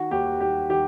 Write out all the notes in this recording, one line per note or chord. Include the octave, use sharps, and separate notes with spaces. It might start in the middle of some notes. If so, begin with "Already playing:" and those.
Already playing: D#3 F#4
D#2 G4
D#2 G4
D#3 G4